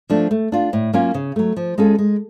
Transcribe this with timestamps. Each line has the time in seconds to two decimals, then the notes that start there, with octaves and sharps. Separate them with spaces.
0.10 F3 A3 D4
0.31 A3
0.52 D4 F4
0.73 A2
0.93 F#3 A#3 C#4 F4
1.14 C#3
1.36 F#3 A3
1.57 F3
1.78 G#3 C#4 F4 A4
1.99 G#3